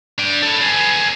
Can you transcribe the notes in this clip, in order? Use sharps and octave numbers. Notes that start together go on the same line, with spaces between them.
D4 G5
E4 A4
G#4 B4